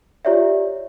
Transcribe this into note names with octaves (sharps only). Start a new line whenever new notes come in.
F4 G4 C#5 D5 E5